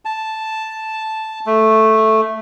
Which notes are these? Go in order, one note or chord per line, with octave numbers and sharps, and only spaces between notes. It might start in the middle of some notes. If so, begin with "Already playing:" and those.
A5
A3